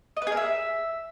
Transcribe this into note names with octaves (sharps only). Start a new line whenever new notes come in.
D#5
B4
G#4
A#4
E5